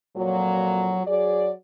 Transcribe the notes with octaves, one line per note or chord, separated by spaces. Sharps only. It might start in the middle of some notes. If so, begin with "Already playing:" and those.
F2 A#2 F#3
F#3 G#4 D5